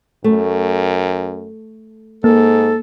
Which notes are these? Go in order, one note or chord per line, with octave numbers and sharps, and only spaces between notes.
F#2 A3
G#2 A#3 A4